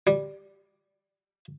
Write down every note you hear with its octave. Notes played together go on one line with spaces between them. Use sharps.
G3